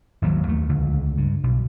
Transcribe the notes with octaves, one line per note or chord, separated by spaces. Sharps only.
G#1 D#2 F3 F#3
D#2 A3
C#2 D3
G2
B1